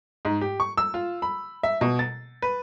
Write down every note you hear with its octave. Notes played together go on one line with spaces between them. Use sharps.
G#2
G4
C#6
E6
F4
B5
E5
B2
A6
B4